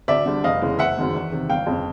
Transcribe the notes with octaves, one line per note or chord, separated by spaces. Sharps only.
D2 D5 E5
D3 G3
F1 D#5 F5
E2 C#3 E3 G#3
F#1 E5 F#5
F#2 D#3 G#3
E2
C3 D#3
G1 F5 G5
F2 C#3